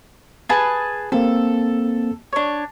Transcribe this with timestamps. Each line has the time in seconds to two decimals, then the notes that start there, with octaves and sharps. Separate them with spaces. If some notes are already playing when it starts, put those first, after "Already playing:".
0.49 G#4 B4 A5
1.12 A#3 C4 A4
2.33 D4 C#5